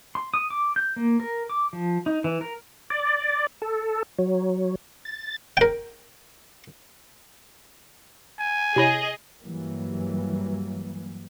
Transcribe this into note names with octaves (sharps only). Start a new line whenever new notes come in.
C6
D#6
D6
G6
A#3
A#4
D6
F3
D#4
E3
A#4
D5
A4
F#3
A6
A#4 G5
G#5
C3 E4 G#4 C#5 D#5
G2 E3 F#3 G3 A#3